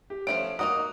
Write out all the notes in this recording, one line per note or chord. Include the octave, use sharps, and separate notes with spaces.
G4
F3 A3 C#4 D7
A#3 D#4 F#4 D#6